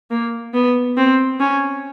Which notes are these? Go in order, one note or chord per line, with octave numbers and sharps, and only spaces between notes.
A#3
B3
C4
C#4